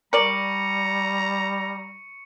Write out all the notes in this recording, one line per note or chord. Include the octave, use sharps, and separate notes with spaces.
G3 A#4 D5 A#5 C#6 C#7